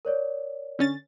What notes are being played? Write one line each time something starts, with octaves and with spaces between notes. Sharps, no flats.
A#4 C#5 D5
D3 C#4 A6